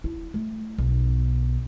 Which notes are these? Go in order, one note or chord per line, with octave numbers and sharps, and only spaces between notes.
E4
A3
B1